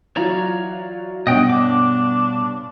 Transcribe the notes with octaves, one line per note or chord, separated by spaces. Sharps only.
E3 F#3 F4 C#5 D5 A#5
G2 B2 C#4 D#5 F#5 G5
D4 D6